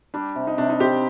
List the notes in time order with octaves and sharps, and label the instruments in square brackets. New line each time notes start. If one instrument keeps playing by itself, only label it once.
[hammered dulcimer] G3 [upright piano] D4
[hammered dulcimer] C3
[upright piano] D#4
[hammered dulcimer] C3 [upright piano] D4
[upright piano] D#4
[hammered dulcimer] C4 [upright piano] G4